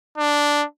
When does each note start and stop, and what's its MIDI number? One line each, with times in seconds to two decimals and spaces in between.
0.17 0.64 62